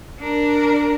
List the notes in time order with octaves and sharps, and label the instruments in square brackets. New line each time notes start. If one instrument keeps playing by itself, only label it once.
[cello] D4 A#4